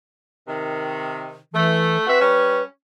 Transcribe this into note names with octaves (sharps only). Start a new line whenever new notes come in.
C3 D#3
E3 A3
C4 F#4 B4 E5
G3 C#4